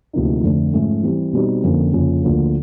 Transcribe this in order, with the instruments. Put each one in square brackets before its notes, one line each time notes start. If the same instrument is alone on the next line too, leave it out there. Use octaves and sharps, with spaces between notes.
[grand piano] D2 C3 F3 A#3 D#4
F2 D3 F3 A3
G#2 F3 A3 C#4
E3 G3 C4
B2 G3 C4 D#4
F2 D3 F3 A#3 C#4
F2 C#3 F3 A#3 C#4
D2 D3 F3 A#3